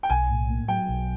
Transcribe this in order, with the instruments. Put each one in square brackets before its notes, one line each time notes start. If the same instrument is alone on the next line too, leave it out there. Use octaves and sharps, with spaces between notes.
[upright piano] G5
[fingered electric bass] B1 [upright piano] G#5
[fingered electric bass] A2
A#3
[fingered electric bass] F#3 [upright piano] G5
[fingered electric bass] B1